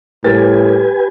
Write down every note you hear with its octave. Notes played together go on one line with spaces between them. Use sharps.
A2 G3 G4 A#4 B4 G#5 A6